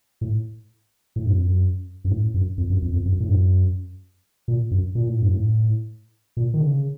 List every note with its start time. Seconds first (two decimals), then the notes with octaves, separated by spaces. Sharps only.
0.21 A2
1.16 A2
1.26 F#2
1.36 F2
1.46 F#2
2.05 F#2
2.11 A2
2.34 F#2
2.58 F2
2.70 F#2
2.82 F2
2.93 F2
3.05 F#2
3.20 A2
3.29 F#2
4.48 A#2
4.71 F#2
4.95 A#2
5.08 A2
5.21 F#2
5.34 A2
6.37 A#2
6.54 D#3
6.60 C#3